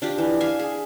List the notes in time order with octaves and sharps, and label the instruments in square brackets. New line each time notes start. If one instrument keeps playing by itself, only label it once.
[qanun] D4 F4 G4
E3
E5 F5 G#5
G#4